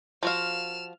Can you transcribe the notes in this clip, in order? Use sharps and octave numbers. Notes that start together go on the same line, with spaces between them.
F3 F#4 F5 F6 E7